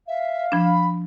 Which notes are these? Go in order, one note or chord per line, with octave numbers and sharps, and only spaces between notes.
E5 F5
F3 D4 B5